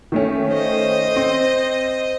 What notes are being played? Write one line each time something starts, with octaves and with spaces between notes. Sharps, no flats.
D#3 A3 C#4
C5 D#5
C4